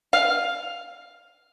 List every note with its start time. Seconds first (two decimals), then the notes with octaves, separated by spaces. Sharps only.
0.13 F5